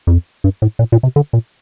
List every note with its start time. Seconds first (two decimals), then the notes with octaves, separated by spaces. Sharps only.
0.07 F2
0.44 G2
0.62 A2
0.79 A#2
0.92 A#2
1.03 C3
1.16 D3
1.33 A#2